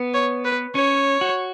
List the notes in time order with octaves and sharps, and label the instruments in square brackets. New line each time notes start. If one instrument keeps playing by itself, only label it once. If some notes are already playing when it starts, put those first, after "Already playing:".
Already playing: [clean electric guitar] B3
[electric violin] C#5
B4
[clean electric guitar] C#4 [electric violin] C#5
[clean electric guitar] F#4